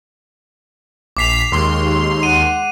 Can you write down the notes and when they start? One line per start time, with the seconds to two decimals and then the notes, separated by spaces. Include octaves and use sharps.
1.17 A#1 D6 B6 C7 F7
1.52 D#2 G#3 C#5 C6
2.23 F#5 D#7